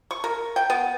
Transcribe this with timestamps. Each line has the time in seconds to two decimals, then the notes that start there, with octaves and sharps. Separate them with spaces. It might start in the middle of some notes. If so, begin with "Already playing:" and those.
0.11 C#6
0.24 A#4
0.56 G5
0.70 B3